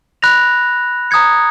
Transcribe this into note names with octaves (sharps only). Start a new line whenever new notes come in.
B5 F#6 A#6 F7
A#5 D#6 G#6 C#7